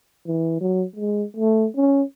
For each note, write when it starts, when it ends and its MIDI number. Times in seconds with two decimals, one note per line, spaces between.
0.27 0.60 52
0.61 0.84 54
0.96 1.24 56
1.37 1.67 57
1.77 2.03 61